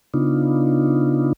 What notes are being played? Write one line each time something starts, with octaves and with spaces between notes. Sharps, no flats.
C#3 B3 D4 D#4 F4